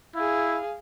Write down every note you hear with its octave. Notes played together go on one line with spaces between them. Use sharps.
E4 G#4 F5